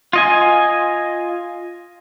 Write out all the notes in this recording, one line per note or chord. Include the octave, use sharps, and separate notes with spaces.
F4 D#5 G#5